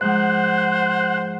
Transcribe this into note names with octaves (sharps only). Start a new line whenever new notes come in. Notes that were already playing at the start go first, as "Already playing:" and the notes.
G#2 F3 G#3 C5 F#5